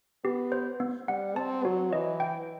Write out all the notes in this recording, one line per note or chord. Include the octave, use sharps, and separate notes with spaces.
B3 G4
C5
B3
G3 F#5
C4 A5
F#3 F#4
E3 D#5
G5